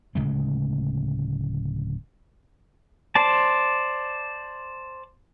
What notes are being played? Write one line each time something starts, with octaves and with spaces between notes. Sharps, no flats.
D1 C#3 G#3 A3
C5 D5 A5